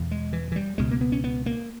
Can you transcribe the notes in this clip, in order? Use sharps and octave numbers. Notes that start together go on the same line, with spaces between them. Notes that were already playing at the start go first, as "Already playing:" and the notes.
Already playing: E2 B2
G#3
E3
E3
G3
C#2 B2 G#3
A#3
B3
C#4
B3
A#3